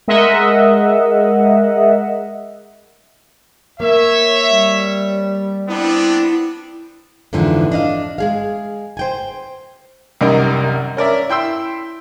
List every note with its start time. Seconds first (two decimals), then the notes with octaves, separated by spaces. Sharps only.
0.08 G#3 A#4 D#5 E5 F#5
3.80 A#3 C#5 E5
4.50 G3
5.69 B3 C4 D4 E4
7.33 F2 G#2 D3 E3 F3
7.71 D4 D#5 F5
8.18 G#3 G#4 F5
8.97 C5 G5 G#5
10.21 C2 F#2 D#3 G3 A#4 D#5
10.97 C#4 A#4 D5 E5
11.29 E4 G5 C6 E6